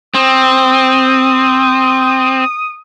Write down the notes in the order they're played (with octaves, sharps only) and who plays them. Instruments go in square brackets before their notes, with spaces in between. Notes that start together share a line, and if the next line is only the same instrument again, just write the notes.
[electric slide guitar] C4 [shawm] D#6